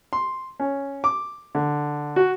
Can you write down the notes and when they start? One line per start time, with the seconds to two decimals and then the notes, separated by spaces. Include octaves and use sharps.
0.13 C6
0.60 C#4
1.04 D6
1.55 D3
2.16 F#4